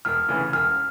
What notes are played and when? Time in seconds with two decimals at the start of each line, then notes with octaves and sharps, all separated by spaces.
0.05 E1 F6
0.29 D2 C#3 E3
0.53 E1 F6